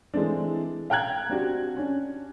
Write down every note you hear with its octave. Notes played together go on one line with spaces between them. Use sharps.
E3 G#3 A3 C4 D4
F5 G5 A#5 F#6 G#6
C4 D4 F#4 G4
C#4 D4